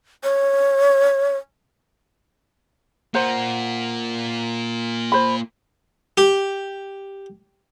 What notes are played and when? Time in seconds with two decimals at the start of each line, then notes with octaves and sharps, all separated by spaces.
0.24 C#5
3.14 A#3 F4 C5 F#5 A#5
5.12 C5 B5
6.17 G4